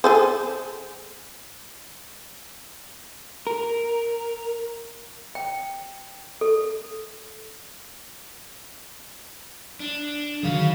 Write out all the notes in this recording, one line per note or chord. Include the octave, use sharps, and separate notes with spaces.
G#4 A4 C5
A#4
G5
A4
D4
D3 D#3 F#3 G#4 F5